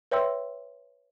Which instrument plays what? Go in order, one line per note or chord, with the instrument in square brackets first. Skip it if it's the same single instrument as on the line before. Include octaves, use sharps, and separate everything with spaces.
[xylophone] B4 C#5 E5 G5 C6 E6